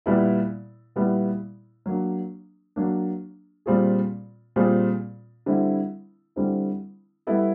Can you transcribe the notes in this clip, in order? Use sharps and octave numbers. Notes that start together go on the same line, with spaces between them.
A#2 G3 B3 E4
A#2 G3 B3 E4
F#3 A#3 D4
F#3 A#3 D4
A#2 G3 C4 F4 G#4
A#2 G3 C4 F4 G#4
D3 G3 C4 E4
D3 G3 C4 E4
G3 B3 E4 A4